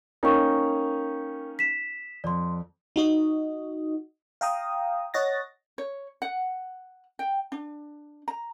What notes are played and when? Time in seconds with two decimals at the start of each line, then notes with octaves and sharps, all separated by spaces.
0.23 A#3 C#4 D#4 A#4 G5 C#6
1.59 B6 E7
2.24 F2 D5 C6
2.96 D#4 F#4 D#5
4.41 F5 G5 A#5 D#6
5.14 C#5 D#5 F#5 A6 A#6
5.78 C#5
6.22 F#5
7.19 G5
7.52 D4
8.28 A#5